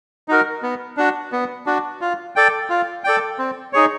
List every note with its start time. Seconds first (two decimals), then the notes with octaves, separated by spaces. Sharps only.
0.28 D#4 F#4 A#4
0.63 B3
0.97 D4 F#4
1.32 B3
1.66 D4 F#4
2.01 F4
2.36 A4 D5 G5
2.70 F4
3.04 A4 D5 G5
3.39 C4
3.73 D#4 G#4 C#5